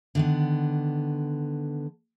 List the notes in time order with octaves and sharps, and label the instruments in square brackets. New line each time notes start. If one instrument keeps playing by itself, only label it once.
[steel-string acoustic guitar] D3 D#3 B3